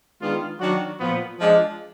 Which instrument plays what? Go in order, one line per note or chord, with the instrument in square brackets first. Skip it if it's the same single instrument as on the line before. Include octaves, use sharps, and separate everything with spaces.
[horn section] D#3 G#3 B3 D4 F4
D#3 F#3 D4 F#4
A#2 F3 B3
F3 G#3 D4